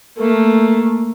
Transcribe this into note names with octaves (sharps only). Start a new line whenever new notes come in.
A3 A#3